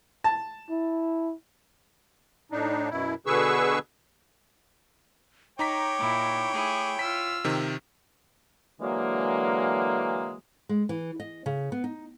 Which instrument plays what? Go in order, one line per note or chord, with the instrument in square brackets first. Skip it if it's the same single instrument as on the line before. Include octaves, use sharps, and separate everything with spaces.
[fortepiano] A5
[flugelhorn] E4
[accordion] A2 D4 D#4
F#2 B2 E4
B2 D3 G#4 B4 C#6 E6
[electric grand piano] D#4 A#5 B6 [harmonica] C#5 G5 [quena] D6
[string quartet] A#2 E4
A3 E4 G#4
[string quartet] F4 E6 F6 [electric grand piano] B6
[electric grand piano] C3 D#3
[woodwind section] D3 E3 F#3 G#3 A#3
[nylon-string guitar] G#3
E3
D#5
C#3
B3
D#4